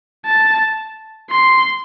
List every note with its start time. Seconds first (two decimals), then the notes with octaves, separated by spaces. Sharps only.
0.26 A5
1.31 C6